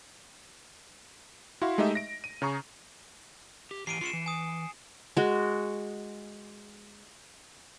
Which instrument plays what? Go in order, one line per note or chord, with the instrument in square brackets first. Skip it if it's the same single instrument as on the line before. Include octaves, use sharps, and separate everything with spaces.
[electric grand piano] E4 F#4 F5 C6
G#3 A3 D#4 G4 D#5 E5
A#6 D7
D#7
C#3 G#4 A#5 C#6
[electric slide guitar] G4
[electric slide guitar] E3 G4 [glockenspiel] C7 D7 D#7
[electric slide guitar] F4 G#4 [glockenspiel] C7 C#7 E7
[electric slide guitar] E3
[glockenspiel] G#5 D#6
[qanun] G#3 F#4